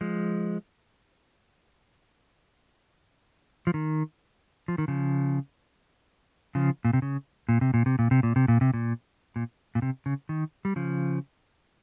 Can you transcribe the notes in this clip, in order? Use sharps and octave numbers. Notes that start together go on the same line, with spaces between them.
F3 G#3
F3
D#3
F3
D#3
C#3 F3
C#3 F3
A#2
C3
C#3
A#2
C3
A#2
C3
A#2
C3
A#2
C3
A#2
C3
A#2
A#2
A#2
C3
C#3
D#3
G3
C#3 F3